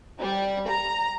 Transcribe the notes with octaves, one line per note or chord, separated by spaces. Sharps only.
G3
A#5